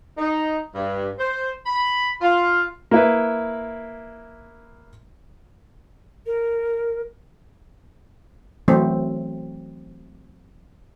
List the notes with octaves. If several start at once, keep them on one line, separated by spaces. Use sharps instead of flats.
D#4
G2
C5
B5
F4
A#3 E4 B4
A#4
E3 F#3 A3 C4